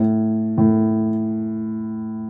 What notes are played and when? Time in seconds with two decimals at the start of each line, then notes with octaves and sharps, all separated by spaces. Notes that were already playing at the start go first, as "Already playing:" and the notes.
Already playing: A2
0.58 A2